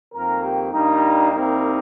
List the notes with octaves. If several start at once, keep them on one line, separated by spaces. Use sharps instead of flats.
F2 D#3 A#3 A#4
G4
G2 G3 A#3 D#4
C2 C3 G3 A#3 D#4